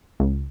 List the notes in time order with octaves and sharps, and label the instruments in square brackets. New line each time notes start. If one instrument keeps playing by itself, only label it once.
[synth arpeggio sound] C#2